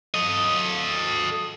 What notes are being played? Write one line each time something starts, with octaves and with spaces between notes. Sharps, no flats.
A4 D#5